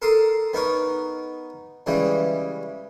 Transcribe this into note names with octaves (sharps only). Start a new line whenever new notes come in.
A4 A#4 C6 D#6
B3 D#4 A#4 C#5
C#3 E3 G3 G#3